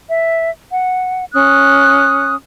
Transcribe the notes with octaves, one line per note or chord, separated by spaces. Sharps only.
E5
F#5
C#4 D#6 F#6